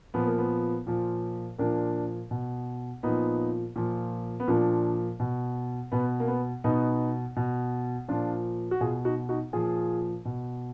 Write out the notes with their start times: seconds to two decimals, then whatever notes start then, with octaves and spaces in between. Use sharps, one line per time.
0.14 A#2 F3 B3
0.27 A#3
0.38 B3
0.87 A#2 F3
1.58 A#2 F3 A#3 D4
2.31 B2
3.03 A#2 F3 B3 D#4
3.76 A#2 F3
4.40 B3
4.48 A#2 F3 A#3 D4
5.20 B2
5.92 B2 B3
6.20 A#3
6.28 B3
6.64 B2 B3 D#4
7.36 B2
8.08 A#2 F3 D4 F4
8.71 F#4
8.81 B2 F4 G#4
9.05 D#4 F#4
9.29 D#4 F#4
9.53 A#2 F3 F4 G#4
10.25 B2